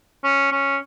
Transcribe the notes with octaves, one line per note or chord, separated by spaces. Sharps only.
C#4
C#4